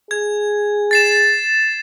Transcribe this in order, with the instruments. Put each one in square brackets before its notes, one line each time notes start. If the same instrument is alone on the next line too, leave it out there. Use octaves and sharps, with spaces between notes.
[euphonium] G#4 [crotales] G#6
[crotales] A6 C7 E7